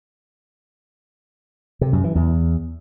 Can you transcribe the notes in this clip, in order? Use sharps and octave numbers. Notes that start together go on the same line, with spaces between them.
C3
F#2
E3
E2